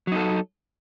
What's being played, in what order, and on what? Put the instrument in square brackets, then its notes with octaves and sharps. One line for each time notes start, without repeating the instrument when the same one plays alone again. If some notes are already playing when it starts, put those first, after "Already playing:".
[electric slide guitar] F#3
D#4
A4